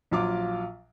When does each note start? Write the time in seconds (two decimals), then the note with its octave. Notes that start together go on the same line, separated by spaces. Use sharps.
0.11 A#1 F#3 F4 F5 D6